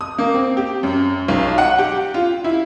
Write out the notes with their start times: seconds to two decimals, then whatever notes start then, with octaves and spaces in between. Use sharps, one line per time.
0.01 D#6
0.18 A#3
0.34 C4
0.57 G4
0.83 F#2
1.28 B1
1.58 F#5
1.78 G4
2.14 F4
2.44 E4